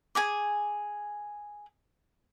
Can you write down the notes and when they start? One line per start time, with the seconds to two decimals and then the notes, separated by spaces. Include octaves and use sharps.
0.15 G#4 G#5 D6